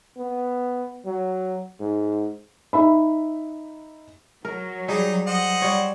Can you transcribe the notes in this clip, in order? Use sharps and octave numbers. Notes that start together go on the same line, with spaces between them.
B3
F#3
G#2
D#4 E5 B5
F#3 A#4
G3 D#4 G#4
C5 D#5 F#5
G3 C#5